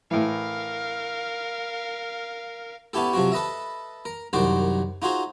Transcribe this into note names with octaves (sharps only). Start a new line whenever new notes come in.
A2 E3 A#4 F5
B3 C#4 E4 G4 A4
C3 F3 F#3 C4 F#4
A4 B4 D#5 E5
A#4
C2 F#2 D#3 F#4 C5 D5
D#4 F4 F#4 G#4 C5